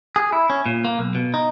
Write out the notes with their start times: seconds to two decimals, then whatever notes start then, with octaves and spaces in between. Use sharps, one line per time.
0.16 G#4
0.32 E4
0.50 C#4
0.66 A#2
0.85 A#3
0.99 B1
1.15 B2
1.34 D#4